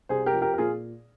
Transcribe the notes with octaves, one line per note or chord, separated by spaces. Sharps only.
C2 G#4 C5
G4 A#4
F3
G4 A#4
A#4
A#2 F4 G#4